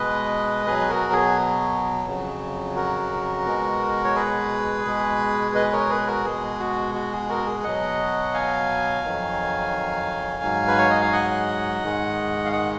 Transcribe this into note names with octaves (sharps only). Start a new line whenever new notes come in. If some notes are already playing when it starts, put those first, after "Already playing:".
Already playing: B2 G#3 B4 D#5
B2 F#3 G#4 B4
F#4 A#4
G#4
F2 C#3 F#3
F#4 A#4
B2 G#3
C#5
G#4 B4
B2 G#3
B4 D#5
A#4 C#5
G#4 B4
F#4 A#4
B2 G#3 G#4
F#4
F#4
G#4
F#4 A#4
G#4
B2 F#3 D#5 F#5
F5 G#5
F2 D#3 F#3
G#2 F#3
B4
C#5
D#5
F5
D#5 F#5
G#2 D#3 G#3
F5
D#5 F#5